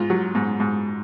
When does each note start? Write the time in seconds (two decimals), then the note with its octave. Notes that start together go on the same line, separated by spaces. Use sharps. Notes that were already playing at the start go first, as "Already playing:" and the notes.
Already playing: G#2 F4
0.10 F#3
0.35 G#2
0.60 G#2